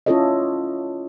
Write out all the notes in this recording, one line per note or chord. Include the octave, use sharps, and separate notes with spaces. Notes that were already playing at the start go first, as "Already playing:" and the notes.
C#4 E4 F4 A4 C#5 D#5